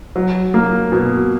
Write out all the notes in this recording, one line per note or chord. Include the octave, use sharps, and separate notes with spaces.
F#3
A#3
B2